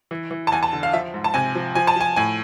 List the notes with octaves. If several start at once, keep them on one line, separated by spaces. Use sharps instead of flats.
E3
E3
A5
E2 G#5
A5
D3
F5
F3 E5
G#2
A5
C3 G#5
F3
F3 G#5
A5
F3 G#5
A2 G#5